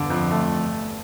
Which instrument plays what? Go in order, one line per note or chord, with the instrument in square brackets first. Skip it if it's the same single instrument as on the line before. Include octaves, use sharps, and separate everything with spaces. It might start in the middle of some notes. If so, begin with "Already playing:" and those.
Already playing: [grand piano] E2 G2 [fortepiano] D3
[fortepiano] F2
A3